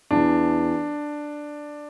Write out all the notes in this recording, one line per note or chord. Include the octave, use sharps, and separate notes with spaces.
E2 E3 D4